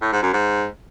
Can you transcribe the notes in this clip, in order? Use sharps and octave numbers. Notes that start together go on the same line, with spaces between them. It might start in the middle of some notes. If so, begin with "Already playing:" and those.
A2
G#2
F#2
G#2